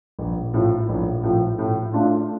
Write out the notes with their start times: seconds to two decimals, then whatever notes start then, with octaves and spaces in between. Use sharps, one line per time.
0.19 A#1
0.54 A2 F3
0.89 A#1
1.23 A2 F3
1.59 A2
1.93 A3 D4 F4